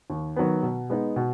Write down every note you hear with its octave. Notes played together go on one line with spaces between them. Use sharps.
D#2
D#3 F#3 B3
B2
G#3 B3 D#4
B2